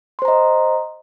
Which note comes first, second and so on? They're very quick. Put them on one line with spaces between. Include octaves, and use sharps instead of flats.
C6 C5 A#5 D#5